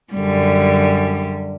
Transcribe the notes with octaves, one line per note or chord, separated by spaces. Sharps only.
F#2 D3 G3